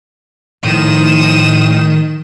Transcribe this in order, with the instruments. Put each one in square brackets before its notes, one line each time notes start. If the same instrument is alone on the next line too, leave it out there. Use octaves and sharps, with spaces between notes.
[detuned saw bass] A2 [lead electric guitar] D#3 [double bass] F3 [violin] D#6 E7